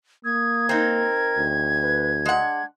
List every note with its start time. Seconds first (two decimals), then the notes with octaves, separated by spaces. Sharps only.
0.25 A#3 D#6 G#6
0.69 C4 D#4 A#4
1.37 D2
1.83 B4
2.25 G#3 D4 F#5